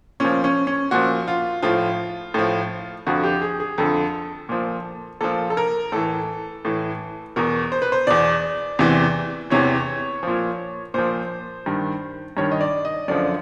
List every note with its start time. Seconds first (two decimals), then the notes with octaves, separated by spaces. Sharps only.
0.20 A#2 F3 C#4
0.44 C#4
0.67 C#4
0.91 A#2 F3 F#4
1.28 F4
1.62 A2 F3 F4
2.34 A2 F3
3.07 F2 D3 F3 F#4
3.24 G4
3.41 G#4
3.60 G#4
3.78 F2 D3 F3 A4
4.49 A#2 F3
5.21 A#2 F3 A4
5.50 A4
5.57 A#4
5.92 A2 E3 A4
6.65 A2 E3
7.36 E2 B2 A#4
7.72 C5
7.82 B4
7.92 C5
8.07 E2 B2 D5
8.79 E2 C3 E3
9.50 E2 C3 E3 C#5
10.23 A#2 F3
10.94 A#2 F3 C5
11.66 G2 D#3
12.37 G2 D#3 C#5
12.52 D#5
12.61 D5
12.85 D#5
13.08 F#2 D3 F3 D5